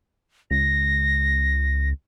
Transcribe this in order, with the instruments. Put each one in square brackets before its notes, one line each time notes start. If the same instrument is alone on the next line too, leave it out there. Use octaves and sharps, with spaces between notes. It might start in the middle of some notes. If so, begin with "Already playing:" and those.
[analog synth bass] C#2 [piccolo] A#6